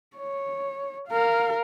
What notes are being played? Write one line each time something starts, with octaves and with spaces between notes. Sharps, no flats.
C#5
A#4 F5